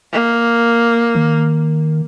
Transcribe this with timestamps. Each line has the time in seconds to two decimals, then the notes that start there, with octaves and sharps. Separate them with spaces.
0.12 A#3
1.15 D#3